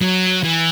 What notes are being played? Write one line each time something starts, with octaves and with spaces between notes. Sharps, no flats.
F#3
E3